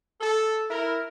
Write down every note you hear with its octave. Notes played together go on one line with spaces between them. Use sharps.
A4
E4 A#4